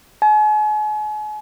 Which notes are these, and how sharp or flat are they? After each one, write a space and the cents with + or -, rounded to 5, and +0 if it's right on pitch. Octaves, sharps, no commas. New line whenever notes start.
G#5 +40